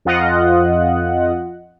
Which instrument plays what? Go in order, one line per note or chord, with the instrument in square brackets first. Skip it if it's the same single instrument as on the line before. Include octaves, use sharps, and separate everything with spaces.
[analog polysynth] F2 F4 D#5 F#5